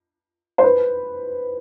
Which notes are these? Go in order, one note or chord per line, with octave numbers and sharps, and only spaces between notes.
C5
B4